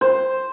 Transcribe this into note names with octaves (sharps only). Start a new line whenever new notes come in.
C5